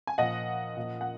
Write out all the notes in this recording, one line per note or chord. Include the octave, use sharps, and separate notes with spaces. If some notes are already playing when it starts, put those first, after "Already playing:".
G#5
A#2 F3 D#5 F#5
A#2 F3
F#5